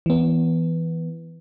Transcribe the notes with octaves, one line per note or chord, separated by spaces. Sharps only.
E3 B3